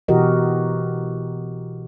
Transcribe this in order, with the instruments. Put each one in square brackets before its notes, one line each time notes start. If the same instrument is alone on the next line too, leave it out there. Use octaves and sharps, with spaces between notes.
[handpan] B2 E3 F#4 G4 A#4 D#5